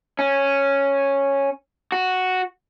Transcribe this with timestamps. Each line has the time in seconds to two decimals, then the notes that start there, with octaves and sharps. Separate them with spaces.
0.19 C#4
1.92 F#4